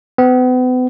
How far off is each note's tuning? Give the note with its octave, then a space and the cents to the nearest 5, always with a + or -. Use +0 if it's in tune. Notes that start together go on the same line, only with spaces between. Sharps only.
B3 +40